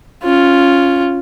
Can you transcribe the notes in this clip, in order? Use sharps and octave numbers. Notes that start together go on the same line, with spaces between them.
C#4 F4